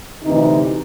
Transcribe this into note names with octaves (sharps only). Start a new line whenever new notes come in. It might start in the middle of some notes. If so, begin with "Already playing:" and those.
D2 C3 E3 D#4